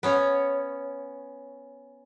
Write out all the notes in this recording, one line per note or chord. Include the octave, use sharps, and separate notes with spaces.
B3 C#4 C#5